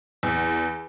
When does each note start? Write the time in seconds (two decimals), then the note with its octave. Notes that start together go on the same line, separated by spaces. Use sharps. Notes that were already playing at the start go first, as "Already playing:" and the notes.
0.23 E2